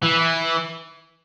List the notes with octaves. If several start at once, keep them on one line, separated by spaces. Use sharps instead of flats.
E3